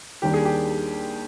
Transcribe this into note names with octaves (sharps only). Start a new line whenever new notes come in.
D#2 D#3 G3 D4 G4
G#4
G4